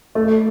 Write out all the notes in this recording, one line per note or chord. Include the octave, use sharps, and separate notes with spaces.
A3